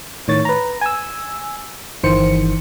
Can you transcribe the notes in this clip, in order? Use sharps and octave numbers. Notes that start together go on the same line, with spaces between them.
A2 D#3 C#5 A6
B4 A#5
G#5 E6
G1 D#3 E3 C5 C#7